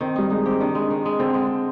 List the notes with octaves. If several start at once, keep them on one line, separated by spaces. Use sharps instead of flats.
D#3 C4
G3 D#4
G#3 D#4
C4 G4
D#3 D4
G#3
D#3
G#3
D3 C4
G#3